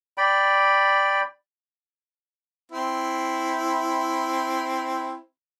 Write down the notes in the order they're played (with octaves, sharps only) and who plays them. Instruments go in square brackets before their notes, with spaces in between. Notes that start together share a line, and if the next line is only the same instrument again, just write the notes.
[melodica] D5 G5 B5
[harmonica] C4 E4